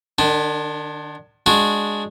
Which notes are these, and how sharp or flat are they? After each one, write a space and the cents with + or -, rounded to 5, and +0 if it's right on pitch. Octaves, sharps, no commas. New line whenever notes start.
D#3 -45 D4 +0
G#3 +0 D4 +0 F#4 -20